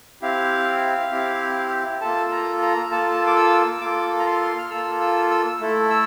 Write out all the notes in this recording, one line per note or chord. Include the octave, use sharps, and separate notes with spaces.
C4 E4 G4 F5
C4 E4 G4
A#3 F4 A4 A5
A#5
A#5
A#3 F4 A4 A5
D6
E6
A#3 F4 A4 D6
A#5
C6
F6
A#3 F4 A4 E6
E6
E6
A3 E4 A4
E6